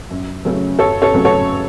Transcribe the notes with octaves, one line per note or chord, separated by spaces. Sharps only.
F#2
C#3 F#3 A3 C#4
F#2 A4 C#5
A4 C#5
C#3 F#3 A3 C#4
A4 C#5